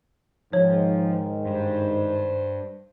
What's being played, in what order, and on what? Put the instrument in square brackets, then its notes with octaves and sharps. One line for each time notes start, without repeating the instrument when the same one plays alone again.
[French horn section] G#2 D#3 [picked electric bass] F3 [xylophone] C#5
[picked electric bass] G2 [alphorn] C5